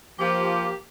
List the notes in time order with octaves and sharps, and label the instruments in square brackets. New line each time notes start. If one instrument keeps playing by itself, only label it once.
[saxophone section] F3 [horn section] A#3 G4